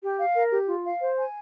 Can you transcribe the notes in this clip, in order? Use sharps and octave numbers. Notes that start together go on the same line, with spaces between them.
G4
F5
A#4
G4
F4
F5
C5
G#5